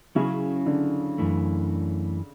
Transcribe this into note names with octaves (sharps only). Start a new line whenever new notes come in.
C#3 F#3 C#4 E4 G#4
D3
F#2 E3 A3